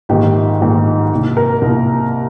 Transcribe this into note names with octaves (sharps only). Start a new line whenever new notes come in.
A#1 G#2 D#3 G4
A#1 G#2 D#3
C2 A#2
A#4
C2 A#2